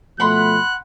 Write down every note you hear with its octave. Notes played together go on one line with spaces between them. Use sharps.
B2 F3 A3 F#5 B5 C6 F#6